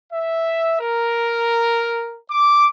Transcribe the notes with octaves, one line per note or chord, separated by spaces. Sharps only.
E5
A#4
D6